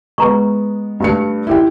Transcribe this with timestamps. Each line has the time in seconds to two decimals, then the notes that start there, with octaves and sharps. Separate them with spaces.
0.18 G#3 B3 B4 A#5 C#6
1.00 G2 A3 C#7
1.47 E4 G4 G5